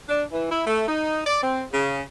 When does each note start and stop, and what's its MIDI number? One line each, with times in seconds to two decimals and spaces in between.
0.09 0.24 62
0.32 0.50 52
0.52 0.63 64
0.67 0.86 57
0.87 1.22 63
1.26 1.40 74
1.43 1.61 60
1.73 2.01 49